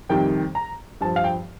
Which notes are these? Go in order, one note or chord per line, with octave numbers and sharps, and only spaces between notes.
F2 C3 D#3 G3 G5
A#5
G2 F3 A5
F5
G5